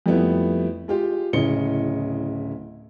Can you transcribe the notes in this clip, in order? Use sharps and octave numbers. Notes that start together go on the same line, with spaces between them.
F2 G3 A3 B3 E4
G#3 F4 G4
D1 C#3 E4 D#5 C#7 G7